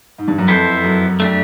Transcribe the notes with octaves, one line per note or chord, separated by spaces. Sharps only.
G#2
G2
F#2
F2 B3 E4 A4 C5
F#2
A3 D4 G4